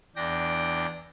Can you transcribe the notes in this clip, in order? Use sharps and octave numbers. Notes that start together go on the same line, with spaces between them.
E2 D4 G5 A#6